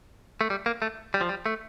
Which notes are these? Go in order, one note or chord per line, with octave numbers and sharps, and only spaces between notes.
A3
G3
A#3
A3
G3
F3
G3
A3